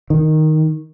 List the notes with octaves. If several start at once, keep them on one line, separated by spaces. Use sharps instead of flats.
D#3